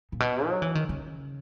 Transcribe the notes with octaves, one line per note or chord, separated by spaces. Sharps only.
A#2
B2
F#3
E3
D#3
C#3